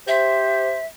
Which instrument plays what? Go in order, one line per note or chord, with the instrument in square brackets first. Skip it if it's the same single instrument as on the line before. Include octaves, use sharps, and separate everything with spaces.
[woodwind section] G4 C5 [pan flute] E5